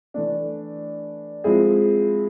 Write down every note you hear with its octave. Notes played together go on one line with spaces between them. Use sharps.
E3 A3 D4
F3 G#3 C4 E4 G#4